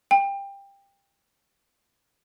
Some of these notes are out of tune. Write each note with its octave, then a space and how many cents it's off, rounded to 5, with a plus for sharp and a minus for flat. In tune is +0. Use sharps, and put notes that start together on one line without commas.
G5 +20